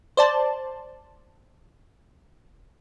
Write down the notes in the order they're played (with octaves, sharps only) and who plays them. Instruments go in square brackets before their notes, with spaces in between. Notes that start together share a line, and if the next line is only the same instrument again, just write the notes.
[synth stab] C5 D5 A5